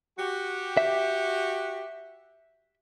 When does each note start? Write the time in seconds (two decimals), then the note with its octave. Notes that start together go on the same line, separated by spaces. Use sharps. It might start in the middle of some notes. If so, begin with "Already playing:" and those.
0.17 F#4 G4
0.77 E5